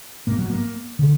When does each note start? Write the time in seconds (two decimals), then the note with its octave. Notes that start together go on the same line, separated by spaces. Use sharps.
0.27 G#2 A#3
0.38 F#3
0.50 A#3
0.99 D3